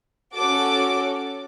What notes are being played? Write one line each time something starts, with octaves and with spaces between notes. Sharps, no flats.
C#4 F#4 A4 D6